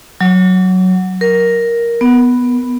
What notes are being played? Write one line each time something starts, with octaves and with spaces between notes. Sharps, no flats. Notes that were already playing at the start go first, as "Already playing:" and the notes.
F#3
A#4
B3